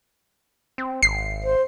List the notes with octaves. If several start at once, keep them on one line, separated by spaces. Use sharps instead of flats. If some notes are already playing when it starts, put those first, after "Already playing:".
C4
G#1 C7
C5